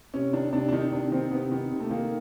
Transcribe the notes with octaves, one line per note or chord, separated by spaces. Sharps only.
C3 C#4
D#3 D4
C3 D4
D4
D#3 D#4
C3 D4
D#3 C4
C3 B3
D#3
C3
A3
D#3 A#3